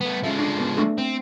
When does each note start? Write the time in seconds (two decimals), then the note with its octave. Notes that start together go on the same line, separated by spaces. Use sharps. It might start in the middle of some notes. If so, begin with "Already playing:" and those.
0.01 A3 B3
0.23 F3 G#3 C#4 A4 E5
0.39 D4 A4
0.59 B3 A#4
0.77 A3 D4 A4
0.98 C4 G5